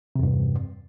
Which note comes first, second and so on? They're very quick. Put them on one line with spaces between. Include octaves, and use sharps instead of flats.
C3 E2 G2